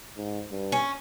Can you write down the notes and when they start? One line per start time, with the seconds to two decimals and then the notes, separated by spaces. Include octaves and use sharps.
0.17 G#2
0.51 G2
0.72 C#4